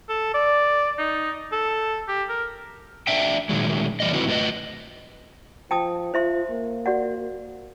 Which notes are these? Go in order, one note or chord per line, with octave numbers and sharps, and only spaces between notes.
A4
D5
D#4
A4
G4
A#4
D4 E5 G5
A#2 D#3 F#3 G#3
E3 G3 D5 D#5
D3 F#3 C4 E4 F#4 B4
A2 F4 A#4 B4 D#5
F3 G5 A5 D#6
F4 C5 E5 C6
A#3
F#4 D5 F#5